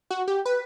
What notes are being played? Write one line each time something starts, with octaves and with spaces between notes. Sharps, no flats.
F#4
G4
B4